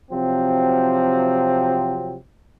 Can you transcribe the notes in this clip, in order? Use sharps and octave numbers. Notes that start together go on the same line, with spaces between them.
C3 F3 F#3 C4